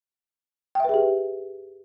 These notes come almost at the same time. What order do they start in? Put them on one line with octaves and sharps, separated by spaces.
G5 E5 B4 G#4 G4